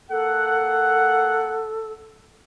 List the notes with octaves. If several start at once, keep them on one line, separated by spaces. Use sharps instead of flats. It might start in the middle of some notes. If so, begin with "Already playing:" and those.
A#3 A4 F#5